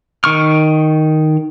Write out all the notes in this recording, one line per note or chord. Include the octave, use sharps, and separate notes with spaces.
D#3 C#6 F6